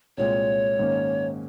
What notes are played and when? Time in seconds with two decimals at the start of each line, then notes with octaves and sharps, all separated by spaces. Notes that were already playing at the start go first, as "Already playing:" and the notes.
0.18 C2 A#2 G#3 C4 F4 C#5
0.79 G#2 D#3 A#3 C#4